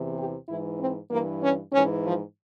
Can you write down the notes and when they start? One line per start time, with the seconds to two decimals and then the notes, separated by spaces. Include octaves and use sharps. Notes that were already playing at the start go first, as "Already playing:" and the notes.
Already playing: E2 C3 E3
0.17 G4
0.48 G#2 E3 E4
0.79 C4
1.10 G2 E3 A#3
1.41 C#4
1.72 G#2 E3 C#4
2.04 F3